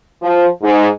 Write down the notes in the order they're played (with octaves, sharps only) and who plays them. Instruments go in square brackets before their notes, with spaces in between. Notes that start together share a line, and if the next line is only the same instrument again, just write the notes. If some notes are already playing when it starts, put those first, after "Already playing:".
[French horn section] F3
G#2